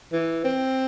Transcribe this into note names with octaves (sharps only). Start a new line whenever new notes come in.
E3
C4